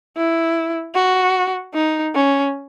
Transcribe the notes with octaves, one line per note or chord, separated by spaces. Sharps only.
E4
F#4
D#4
C#4